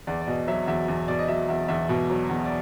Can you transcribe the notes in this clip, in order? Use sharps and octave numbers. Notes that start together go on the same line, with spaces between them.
E2 D5
D5
B2 D#5
F#3 E5
E2 E5
E2
B2 D5
D#5
F#3 E5
E2 E5
E2 E5
B2
F#3
E2
D5